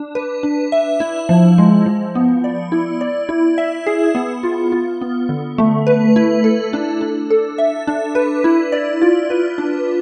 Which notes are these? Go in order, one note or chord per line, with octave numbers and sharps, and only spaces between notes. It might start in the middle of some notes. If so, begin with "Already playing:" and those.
Already playing: D4
B4
D4
E5
E4
F3
G#3
F3
B3
D5
E4
D5
E4
E5
G#4
B3
F4
F4
B3
D3
A3
B4
E4
A4
D4
D4
A4
E5
D4
B4
E4
D5
F4
B4
D4